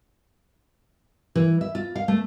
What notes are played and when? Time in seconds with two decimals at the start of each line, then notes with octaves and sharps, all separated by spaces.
1.35 E3
1.61 E5
1.75 F4
1.95 F5
2.08 A3